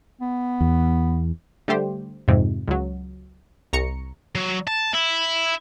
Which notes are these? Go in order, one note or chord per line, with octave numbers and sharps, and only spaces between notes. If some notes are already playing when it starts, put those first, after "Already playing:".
B3
E2
D3 G3 A3 G4 C5
F2 G#2 C3
C#2 F#3
C2 A#5 C#6 C#7
F#3
A5
E4